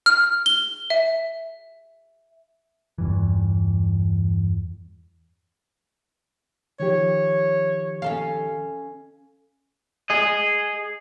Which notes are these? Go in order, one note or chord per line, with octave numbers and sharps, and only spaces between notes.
F6
G7
E5
E2 G2 E3
D#3 F3 G4 C#5
C#4 A4 F5
G#4 D#5